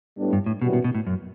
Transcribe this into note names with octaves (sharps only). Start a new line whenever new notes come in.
A2 G3 B3 D4
G2
A2
F#2 B2 E3 G3 B3 F#4
B2
B2
A2
F#2